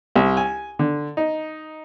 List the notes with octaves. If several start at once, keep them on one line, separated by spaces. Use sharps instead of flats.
C2
G#5
D3
D#4